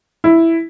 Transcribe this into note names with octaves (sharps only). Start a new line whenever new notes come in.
E4